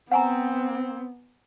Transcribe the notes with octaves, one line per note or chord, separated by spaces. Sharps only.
B3 C4 F#5 G#5 A#5